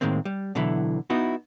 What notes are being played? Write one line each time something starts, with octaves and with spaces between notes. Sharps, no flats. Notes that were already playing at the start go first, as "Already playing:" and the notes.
A2 D#3 G#3 A#3 C4
G3
B2 D3 E3 F#3 E4
B3 D#4 E4 F#4